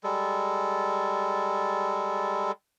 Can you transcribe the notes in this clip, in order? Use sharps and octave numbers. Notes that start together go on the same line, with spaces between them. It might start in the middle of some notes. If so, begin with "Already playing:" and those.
G3 G#3 A4